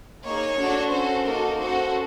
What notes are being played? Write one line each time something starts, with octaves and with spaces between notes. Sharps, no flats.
A#3 D#4 G#4 C#5
D4 F#4 A4
C#4 F#4 A4 C5
A#3 D#4 F#4 A4 A#4
C#4 F#4 A4 C5